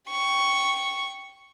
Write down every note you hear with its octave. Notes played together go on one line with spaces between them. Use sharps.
G5 C#6